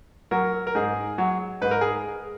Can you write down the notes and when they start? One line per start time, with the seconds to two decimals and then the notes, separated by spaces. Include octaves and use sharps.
0.31 F#3 A#4
0.67 A#4
0.75 G#2 G#4
1.18 F#3
1.61 G#2 B4
1.71 A#4
1.81 G#4